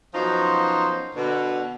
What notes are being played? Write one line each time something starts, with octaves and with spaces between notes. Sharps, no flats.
F#2 B2 F3 D#4 C5 C#5
B2 D3